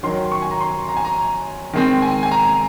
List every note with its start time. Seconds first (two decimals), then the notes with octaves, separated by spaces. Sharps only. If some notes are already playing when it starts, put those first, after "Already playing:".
0.03 D#3 F#3 C#4 C6
0.31 C#6
0.42 G#5
0.51 A#5
0.60 C6
0.89 A#5
0.97 G#5
1.05 A#5
1.73 D#3 G#3 C4
2.02 G#5
2.23 G#5
2.31 A#5